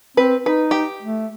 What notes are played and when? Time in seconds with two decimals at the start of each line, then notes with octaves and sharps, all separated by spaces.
0.17 C4 B4
0.46 D#4 B4
0.71 G4
1.02 A3